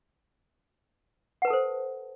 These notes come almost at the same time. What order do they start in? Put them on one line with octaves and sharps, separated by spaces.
F#5 B4 A5 A4 C5